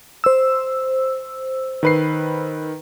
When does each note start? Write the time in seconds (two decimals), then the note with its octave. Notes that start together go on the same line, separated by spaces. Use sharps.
0.24 C5 E6
1.83 D#3 B4 C7